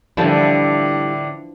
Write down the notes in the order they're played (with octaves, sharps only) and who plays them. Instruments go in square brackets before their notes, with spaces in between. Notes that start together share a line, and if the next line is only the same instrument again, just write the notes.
[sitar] A2 D3 [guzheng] E3 F3 D4 [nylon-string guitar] G3 E4